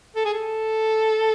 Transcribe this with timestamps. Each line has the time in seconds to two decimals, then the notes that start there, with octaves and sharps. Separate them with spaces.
0.16 A4
0.25 G#4
0.34 A4